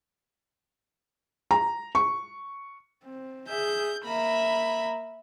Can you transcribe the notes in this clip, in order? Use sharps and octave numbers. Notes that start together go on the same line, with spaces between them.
A#5
C#6
C4
G#4 E5 G6
A#3 E5 A#5 B5